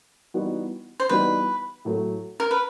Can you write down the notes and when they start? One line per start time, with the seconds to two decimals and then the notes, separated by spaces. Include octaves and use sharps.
0.34 E3 G3 B3 D#4 F#4
1.00 C5
1.09 E3 G3 B3 D#4 F#4 B4
1.85 A2 F#3 A3
2.40 A#4
2.51 B4